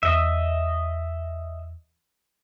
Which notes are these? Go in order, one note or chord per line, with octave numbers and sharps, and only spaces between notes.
E2 D#5 E5